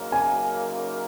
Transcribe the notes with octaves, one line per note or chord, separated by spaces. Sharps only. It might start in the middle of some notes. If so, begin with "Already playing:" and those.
Already playing: F#2 C#3 A#3 D#4 A#4
G#5